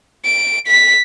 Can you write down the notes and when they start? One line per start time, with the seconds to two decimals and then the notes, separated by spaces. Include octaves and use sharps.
0.25 D7
0.67 B6